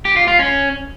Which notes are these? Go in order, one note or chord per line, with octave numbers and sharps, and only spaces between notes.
G4
F4
F4
C#4